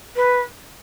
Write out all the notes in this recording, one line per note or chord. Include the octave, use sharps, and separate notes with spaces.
B4